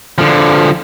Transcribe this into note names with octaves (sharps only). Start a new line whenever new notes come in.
D3 F3